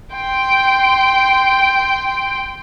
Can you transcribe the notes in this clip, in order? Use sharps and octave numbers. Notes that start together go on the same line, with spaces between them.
G5 C6